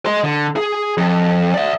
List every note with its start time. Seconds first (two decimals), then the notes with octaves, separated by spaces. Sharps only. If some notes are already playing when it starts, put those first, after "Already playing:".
0.06 D#5 C6
0.24 D3
0.56 G#4
0.97 F2
1.54 D5 E5